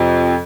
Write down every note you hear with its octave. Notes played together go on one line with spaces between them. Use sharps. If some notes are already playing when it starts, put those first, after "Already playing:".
Already playing: F2 C3 F3